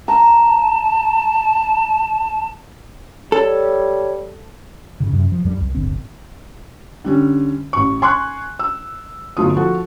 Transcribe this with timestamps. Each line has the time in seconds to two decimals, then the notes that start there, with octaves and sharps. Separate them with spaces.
0.08 A5 A#5
3.32 G3 A4 C#5
5.00 G#2 C#3
5.13 F#2 C3
5.32 F3
5.45 F2 F#3 G3
5.61 C2
5.75 D1 G1 D2 C4
7.04 D3 G3 C#4
7.73 A1 C#6
8.02 G#5 C6 C#6 F#6
8.59 E6
9.37 G1 F#3 A3 F4 D#6
9.56 F3 F#4 A4